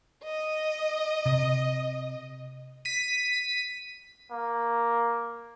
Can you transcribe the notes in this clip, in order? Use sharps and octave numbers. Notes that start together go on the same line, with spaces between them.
D#5
C3
B6 D#7
A#3